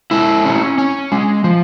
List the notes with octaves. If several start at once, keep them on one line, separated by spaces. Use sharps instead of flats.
G#3 E4
C#4
C#4
G#3
F3